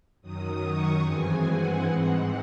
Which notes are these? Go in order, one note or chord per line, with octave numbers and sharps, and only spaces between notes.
F#2 D#3 F#3 D#6
C#6
G2 E3 G#3 C4 G#5
F#5
G#2 E3 G#3 C4 F#5